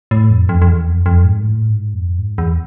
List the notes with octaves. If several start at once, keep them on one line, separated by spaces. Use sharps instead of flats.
A2
F2
F2
F2
E2
F2
F2
G#2
A2
G#2
F2
G#2
E2